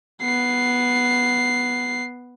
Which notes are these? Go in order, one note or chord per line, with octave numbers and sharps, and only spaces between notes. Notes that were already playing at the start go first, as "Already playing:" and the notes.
B3 C7